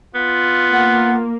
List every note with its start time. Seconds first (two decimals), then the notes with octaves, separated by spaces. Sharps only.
0.15 B3 F4
0.73 A#3 F#5